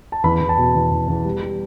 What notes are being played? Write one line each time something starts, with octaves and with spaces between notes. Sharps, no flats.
A5
E2 B5
E2
A5
B2
E2
E2
E2
G3
G3